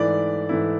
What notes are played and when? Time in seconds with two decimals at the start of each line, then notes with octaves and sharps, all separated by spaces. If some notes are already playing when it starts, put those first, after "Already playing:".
Already playing: G#2 E3 A3 E4 D5
0.49 G#2 E3 A3 E4